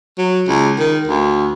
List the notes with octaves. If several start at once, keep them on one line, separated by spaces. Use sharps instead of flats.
F#3
C#2
D#3
D2